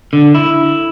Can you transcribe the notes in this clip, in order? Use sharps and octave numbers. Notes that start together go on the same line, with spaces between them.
D3
E4